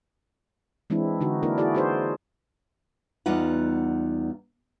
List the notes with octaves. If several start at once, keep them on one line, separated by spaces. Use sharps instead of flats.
E3 G#3 C4 D4 E4
D3 D#4 F#4
A#3 D4 E4 A#4
E4 F#4 G#4 D5
D#4 F#4 G#4 B4 C5 D5
E2 G3 D#4 F4 F#5